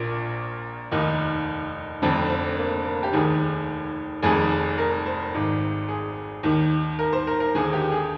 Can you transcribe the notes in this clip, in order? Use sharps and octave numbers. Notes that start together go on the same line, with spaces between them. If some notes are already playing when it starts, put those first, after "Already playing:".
Already playing: A#1 A#2 A#4
F1 D#2 D#3 D#4
F1 F2 D3 C4
C4
A#3
A#3
G4
F1 D#2 D#3 G#4
F1 F2 D#3 G#4
A#4
C5
G#1 G#2 D#3
G#4
D#2 D#3
A#4
C5
A#4
A#4
D#2 D3 G#4
G4
G#4